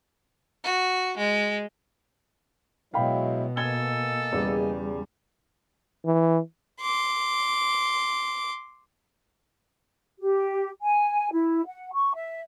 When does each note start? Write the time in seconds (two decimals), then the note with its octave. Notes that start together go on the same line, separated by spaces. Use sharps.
0.64 F#4
1.17 G#3
2.94 B2 F#3 G#3 E4 F5 G5 B5
3.57 A#3 A4 D#5 G#5 E6 G#6 G7
4.32 E2 C#3 G3
6.05 E3
6.81 C6 D6
10.20 G4
10.83 G#5
11.32 E4
11.66 F#5
11.93 C#6
12.14 E5